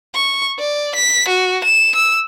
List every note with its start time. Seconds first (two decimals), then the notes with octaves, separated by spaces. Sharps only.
0.15 C#6
0.59 D5
0.95 B6
1.28 F#4
1.64 E7
1.95 E6